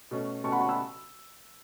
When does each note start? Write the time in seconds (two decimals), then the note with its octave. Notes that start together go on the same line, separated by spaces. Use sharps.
0.11 B2 A3 C#4
0.44 B2 A3 C#4 A5 C#6
0.52 F#5 B5
0.60 A5 C#6
0.69 B5 E6